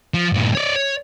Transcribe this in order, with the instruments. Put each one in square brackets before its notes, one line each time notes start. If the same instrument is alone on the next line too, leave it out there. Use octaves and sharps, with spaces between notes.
[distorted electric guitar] F3
G2 A#2
C#5 D5
C#5